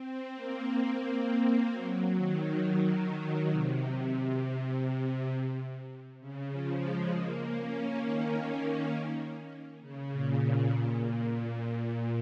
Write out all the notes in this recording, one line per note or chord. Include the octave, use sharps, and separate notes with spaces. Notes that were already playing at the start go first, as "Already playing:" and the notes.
Already playing: C4
A#3
F#3
D#3
C3
C#3
F3
G#3
A#3
C#4
D#3
C#3
A#2
A#2
A#2
A#2